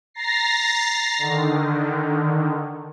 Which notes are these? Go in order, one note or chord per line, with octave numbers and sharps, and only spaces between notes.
A#5 A6 A#6 C7
D3 D#3